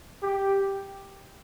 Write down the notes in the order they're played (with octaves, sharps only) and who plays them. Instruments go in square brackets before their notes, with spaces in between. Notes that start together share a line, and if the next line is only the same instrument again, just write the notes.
[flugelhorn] G4